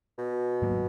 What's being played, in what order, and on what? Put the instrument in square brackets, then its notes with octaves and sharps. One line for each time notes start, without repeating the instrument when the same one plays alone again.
[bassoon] B2
[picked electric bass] G#2 F#3 A#3